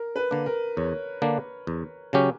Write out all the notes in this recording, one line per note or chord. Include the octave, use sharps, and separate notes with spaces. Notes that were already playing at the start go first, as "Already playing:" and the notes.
Already playing: A#4
B4
D3 A#3 D4
A#4
E2 C#5
D3 A#3 D4
E2
C#3 F#3 C#4 G4